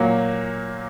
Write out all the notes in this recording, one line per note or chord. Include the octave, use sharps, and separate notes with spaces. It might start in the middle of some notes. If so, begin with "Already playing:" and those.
Already playing: A#2 F#3 A#3